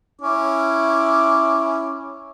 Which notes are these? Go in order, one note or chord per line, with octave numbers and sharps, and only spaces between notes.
C#4 E4 D6